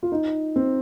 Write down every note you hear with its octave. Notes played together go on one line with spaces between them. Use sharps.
F4
D#4
C4